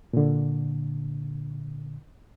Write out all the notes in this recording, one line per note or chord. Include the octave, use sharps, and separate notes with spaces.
A#2 D3